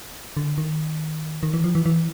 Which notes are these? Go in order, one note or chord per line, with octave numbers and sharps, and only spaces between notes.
D3
D#3
D#3
E3
F3
E3
E3